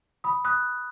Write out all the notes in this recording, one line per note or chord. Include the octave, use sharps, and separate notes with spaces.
B5 D#6
D#6 F#6